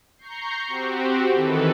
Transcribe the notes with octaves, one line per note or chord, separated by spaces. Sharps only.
A#5 C#6 G6 C7
C4 F#4 G4
D#3 E3 A4 B4